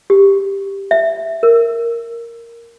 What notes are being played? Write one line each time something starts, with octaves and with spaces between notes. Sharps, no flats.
G4
E5
A#4